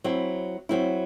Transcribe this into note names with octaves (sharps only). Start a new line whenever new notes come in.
F#3 C4 E4
F#3 C4 E4